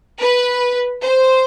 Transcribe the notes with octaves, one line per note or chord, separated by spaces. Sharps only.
B4
C5